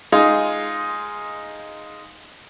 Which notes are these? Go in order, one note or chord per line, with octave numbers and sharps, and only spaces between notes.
G#3 D#4 F4 G#4